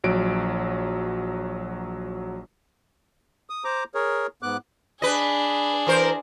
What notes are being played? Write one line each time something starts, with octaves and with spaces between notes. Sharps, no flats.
A#1 F#3 D7
D#6
C5 A#5 D6
G#4 A#4 C#5
G#2 B3 D6 F#6
D4 G#4 B4 D#5
E3 A#4 C5